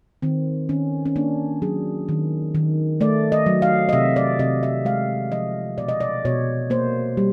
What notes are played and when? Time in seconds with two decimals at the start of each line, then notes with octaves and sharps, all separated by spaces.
0.22 D#3 C4
0.69 D#3 C#4
1.06 C#4
1.16 A#3 D4
1.62 F#3 G#4
2.09 D#3
2.55 D#3
3.01 A3 D5
3.32 D#5
3.46 F#3
3.62 F5
3.89 D#5
3.93 C3 E5
4.16 D5
4.39 C3 D#5
4.63 E5
4.85 G#3 F5
5.32 F3 D#5
5.78 B2 D5
5.88 D#5
6.00 D5
6.25 B2 C#5
6.70 A#3 C5
7.17 G3